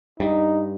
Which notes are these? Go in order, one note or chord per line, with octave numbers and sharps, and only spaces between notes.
G2 D#4